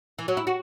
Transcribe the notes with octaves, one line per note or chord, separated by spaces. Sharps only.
E3
F#3
E4
F#4